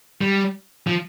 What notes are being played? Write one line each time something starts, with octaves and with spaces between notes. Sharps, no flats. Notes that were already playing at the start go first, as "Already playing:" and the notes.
G3
F3